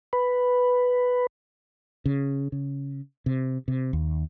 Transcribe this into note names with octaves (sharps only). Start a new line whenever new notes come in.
B4
C#3
C#3
C3
C3
D#2